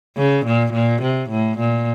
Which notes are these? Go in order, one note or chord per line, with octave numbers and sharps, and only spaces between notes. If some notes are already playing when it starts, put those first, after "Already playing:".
C#3
A#2
A#2
C3
A2
A#2